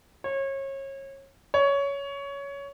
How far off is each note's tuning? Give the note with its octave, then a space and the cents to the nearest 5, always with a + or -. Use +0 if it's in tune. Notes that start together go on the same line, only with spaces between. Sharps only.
C#5 -30
C#5 +15